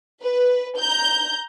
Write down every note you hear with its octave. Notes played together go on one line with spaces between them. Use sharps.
B4
A#5 G6